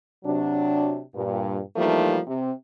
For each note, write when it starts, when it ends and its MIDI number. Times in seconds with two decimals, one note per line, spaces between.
0.25 1.00 48
0.25 1.00 54
0.25 1.00 62
1.15 1.60 43
1.15 1.60 46
1.76 2.20 52
1.76 2.20 53
1.76 2.20 55
1.76 2.20 57
1.76 2.20 58
1.76 2.20 63
2.27 2.51 48